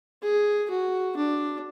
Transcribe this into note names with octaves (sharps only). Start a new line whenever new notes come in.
G#4
F#4
D4